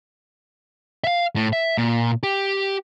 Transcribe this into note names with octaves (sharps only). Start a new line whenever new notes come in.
E5 F5
A2
E5
A#2
G4